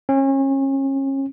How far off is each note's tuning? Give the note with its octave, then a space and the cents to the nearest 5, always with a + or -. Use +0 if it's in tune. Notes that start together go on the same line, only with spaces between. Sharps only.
C#4 -35